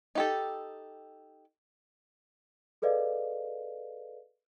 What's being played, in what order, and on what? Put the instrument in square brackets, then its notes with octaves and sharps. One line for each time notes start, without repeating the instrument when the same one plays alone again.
[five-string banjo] D#4 G4 A4
[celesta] G#4 A4 B4 D5 D#5 F5